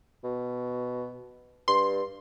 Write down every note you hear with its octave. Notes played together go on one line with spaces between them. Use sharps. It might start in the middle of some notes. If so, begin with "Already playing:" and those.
B2
G2 C6